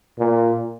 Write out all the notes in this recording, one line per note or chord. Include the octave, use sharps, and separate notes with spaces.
A#2